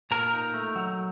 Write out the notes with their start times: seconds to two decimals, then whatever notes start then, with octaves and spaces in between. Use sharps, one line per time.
0.11 A#2 A#4 A#5
0.33 D#4
0.54 A3
0.76 F#3